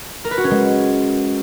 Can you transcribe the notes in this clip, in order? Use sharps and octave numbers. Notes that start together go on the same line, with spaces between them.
A#4
B4
F#4
C#4
G#3